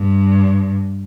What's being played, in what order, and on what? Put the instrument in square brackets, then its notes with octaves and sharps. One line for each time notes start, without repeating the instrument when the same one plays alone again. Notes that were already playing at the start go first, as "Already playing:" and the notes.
Already playing: [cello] G2